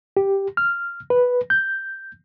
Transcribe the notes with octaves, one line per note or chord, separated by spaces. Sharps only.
G4
F6
B4
G6